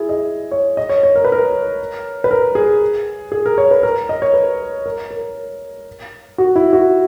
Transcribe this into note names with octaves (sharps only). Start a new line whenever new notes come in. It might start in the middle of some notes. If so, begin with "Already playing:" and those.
Already playing: E4 G#4
D#5
C#5
D#5
C#5
C#5
A#4
B4
A#4
B4
A#4
G#4
G#4
A#4
C#5
B4
A#4
D#5
C#5
B4
A#4
A#4
F#4
E4
F#4